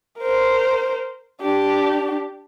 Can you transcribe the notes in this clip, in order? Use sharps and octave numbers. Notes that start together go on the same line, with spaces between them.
A#4 C5
D4 G4